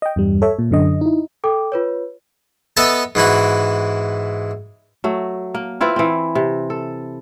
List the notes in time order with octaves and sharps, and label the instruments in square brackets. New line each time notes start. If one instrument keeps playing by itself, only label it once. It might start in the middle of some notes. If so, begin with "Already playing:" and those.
[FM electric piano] D#5 G5
E2 G2 G3
A4 C#5 E5
A#2
F#2 D3 D#5
D#4 E4
[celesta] A4 G5 D6
F4 B4 C#5
[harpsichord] B3 A4 D#5 E5 A5
G#2 E3 E4 F#4
[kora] F#3 A3
A#3
C4 E4 F4 B4
E3 C4
C3
A4